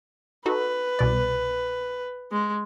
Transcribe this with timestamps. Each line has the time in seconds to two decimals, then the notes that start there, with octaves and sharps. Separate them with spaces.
0.46 D#4 F#4 A4 B4
0.99 C2 B2 D5
2.31 G#3